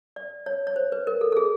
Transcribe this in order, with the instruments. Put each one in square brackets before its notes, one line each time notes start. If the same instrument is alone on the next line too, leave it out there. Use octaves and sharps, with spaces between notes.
[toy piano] D5
C#5
C#5
C5
B4
A#4
A4
A4
G#4